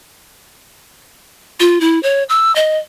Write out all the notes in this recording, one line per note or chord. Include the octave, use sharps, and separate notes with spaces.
F4
E4
C#5
E6
D#5